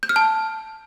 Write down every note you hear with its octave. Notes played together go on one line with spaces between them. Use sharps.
G6
F6
A5